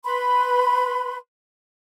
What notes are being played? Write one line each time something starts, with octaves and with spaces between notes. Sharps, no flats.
B4 B5 C6